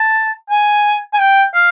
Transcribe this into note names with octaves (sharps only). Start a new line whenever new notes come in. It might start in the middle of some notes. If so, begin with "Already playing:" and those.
Already playing: A5
G#5
G#5
G5
F5